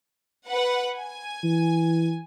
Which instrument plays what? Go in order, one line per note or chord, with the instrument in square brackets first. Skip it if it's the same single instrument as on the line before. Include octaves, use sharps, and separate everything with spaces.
[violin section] B4 F#5
G#5
[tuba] E3